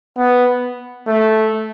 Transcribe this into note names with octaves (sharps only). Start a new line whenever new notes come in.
B3
A3